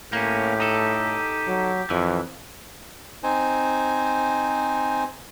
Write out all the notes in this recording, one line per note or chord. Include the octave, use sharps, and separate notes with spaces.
A2 A#3 C#4 G4
D#4 A4
F#3
F2 E3
C4 D#4 C5 G#5